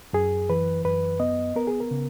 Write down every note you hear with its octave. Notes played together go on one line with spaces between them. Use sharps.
F#2 G#4
E3 B4
F#2 B4
B3 D#5
B3 A#4
G#4
A#4
C#3